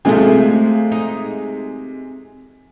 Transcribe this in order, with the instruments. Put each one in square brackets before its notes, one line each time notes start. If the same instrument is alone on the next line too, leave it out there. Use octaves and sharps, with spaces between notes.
[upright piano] C3 G#3 G#4 [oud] F3 A3
[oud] D#4